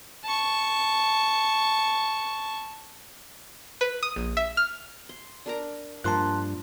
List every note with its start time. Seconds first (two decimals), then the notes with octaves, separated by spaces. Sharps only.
0.24 A5 C#6
3.81 B4
4.03 D#6
4.16 A#1
4.37 E5
4.57 F6
5.09 C6
5.46 D4 A#4 A#5
6.04 G2 F3 A#3 A5 C6 F#6